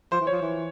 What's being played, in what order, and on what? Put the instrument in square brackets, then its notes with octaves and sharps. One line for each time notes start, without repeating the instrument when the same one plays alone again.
[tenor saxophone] F3 [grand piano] C5
[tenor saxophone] E3
[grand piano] C#5
[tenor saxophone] F3
E3